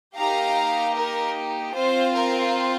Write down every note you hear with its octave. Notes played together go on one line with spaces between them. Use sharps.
A#3 D#4 G4 F5 A#5
A#4
C4 F4 C5
A#4